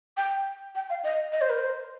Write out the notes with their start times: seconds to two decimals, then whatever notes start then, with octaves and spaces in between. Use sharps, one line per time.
0.17 G5
0.75 G5
0.90 F5
1.04 D#5
1.32 D#5
1.41 C5
1.50 A#4
1.58 C5